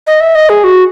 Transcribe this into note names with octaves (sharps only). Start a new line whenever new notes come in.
D#5
E5
D#5
G#4
F#4